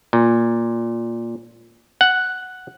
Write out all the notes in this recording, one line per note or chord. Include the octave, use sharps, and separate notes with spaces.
A#2
F#5